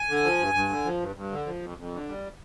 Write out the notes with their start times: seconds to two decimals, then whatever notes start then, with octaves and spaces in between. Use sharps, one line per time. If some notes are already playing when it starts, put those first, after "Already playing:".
Already playing: G#5
0.09 D3
0.24 F3
0.39 G2
0.54 G2
0.69 D3
0.85 F3
1.00 G2
1.16 G2
1.31 D3
1.46 F3
1.62 F2
1.78 F2
1.93 D3
2.08 G3